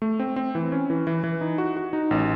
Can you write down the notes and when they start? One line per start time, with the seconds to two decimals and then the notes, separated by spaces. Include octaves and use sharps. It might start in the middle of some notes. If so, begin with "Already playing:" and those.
0.02 A3
0.19 C4
0.36 C4
0.55 E3
0.72 C#4
0.90 E3
1.07 E3
1.24 E3
1.41 D#4
1.58 F#4
1.77 F#4
1.93 D#4
2.11 A1